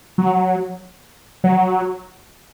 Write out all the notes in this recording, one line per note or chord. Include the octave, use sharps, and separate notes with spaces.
F#3
F#3